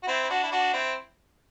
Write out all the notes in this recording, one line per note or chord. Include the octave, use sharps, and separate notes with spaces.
F#4
C4 E4
E4
D4 F#4
E4
D4 F#4
C4 E4